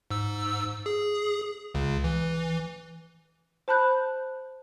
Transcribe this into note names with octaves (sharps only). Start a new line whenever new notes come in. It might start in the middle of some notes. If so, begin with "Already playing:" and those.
G#2 E6
G#4
C#2 C#3
E3
C5 A5 B5 F#6 G6